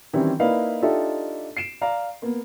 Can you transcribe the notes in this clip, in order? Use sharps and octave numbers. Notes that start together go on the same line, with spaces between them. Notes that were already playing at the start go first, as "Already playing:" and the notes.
D#3 E3 G3 C4 C#4
A#3 D#4 E4 B4 D5 F5
D4 D#4 F4 G4 A4 E5
C7 D7 E7
D5 F5 A#5
A#3 B3